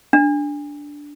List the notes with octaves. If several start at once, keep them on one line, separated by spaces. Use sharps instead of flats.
D4